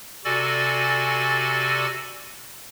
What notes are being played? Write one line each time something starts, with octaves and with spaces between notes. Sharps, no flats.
C3 F#4 A4 D5 G#5 A6